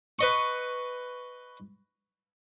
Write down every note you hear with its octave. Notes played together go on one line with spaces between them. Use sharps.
B4 D#5 C#6